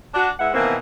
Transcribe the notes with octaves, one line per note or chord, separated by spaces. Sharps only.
D4 F#4
G#3 B3 E4 E5 F#5
B2 D#3 E3 A#3 C4